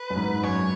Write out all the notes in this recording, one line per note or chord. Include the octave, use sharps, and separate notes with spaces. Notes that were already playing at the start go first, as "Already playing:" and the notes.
Already playing: B4
F#2
G#2
F#2 C#5